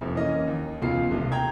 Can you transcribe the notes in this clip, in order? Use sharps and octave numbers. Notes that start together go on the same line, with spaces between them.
F1 F2
E3 A#3 C#4 D#5
D#2
E1 C#2 B2 F4 C7
D#1 C2
G5 A#5 G#6